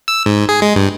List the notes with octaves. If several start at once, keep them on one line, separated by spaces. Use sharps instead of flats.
E6
G#2
G#4
G#3
G2